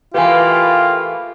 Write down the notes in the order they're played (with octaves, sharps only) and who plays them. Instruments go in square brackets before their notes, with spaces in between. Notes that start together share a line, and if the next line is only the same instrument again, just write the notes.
[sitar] E3 A3 A#3 [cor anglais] F4 [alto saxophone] G4 [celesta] B4 F5 G#5